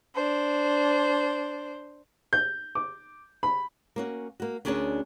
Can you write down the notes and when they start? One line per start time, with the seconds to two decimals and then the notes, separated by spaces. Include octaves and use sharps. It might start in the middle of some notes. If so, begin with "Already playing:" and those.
0.15 D4 C5
2.33 G6
2.75 D6
3.43 B5
3.96 A#3 C#4 F#4
4.40 A#3 F#4
4.65 D2 C#4 D4 G#4 A#4 C#5